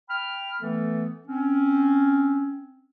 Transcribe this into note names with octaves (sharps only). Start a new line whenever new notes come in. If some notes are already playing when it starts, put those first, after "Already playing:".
G5 B5 F6
E3 A3 B3 A4
C4 C#4